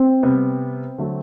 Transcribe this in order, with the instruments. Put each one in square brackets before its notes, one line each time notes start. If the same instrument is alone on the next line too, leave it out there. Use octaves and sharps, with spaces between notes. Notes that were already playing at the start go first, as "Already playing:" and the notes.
Already playing: [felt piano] C4
[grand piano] C3 G3 B3
D3 F#3 A3